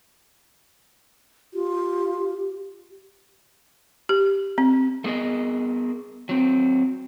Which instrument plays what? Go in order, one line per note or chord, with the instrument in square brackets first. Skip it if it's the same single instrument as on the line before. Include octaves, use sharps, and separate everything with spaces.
[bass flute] F4 [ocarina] G4
[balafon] G4
C4
[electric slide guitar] A3 B3 G#4 A#4 D#5
F#3 C4